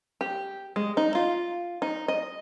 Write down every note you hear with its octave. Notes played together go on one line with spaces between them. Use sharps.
G4
G#3
D#4
F4
D#4
D#5